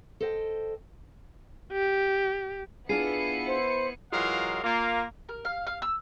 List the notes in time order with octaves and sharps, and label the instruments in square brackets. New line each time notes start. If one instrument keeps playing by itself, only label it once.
[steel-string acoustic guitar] A4 C5 D#5 G5
[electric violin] G4
[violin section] B3 E4 C#7 [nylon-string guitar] D4 F4 G#4 [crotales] C7 D#7
[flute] C5
[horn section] E3 F#3 G#3 F4 A#4 F5
A#3 F4
[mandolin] A#4
F5
F5
E6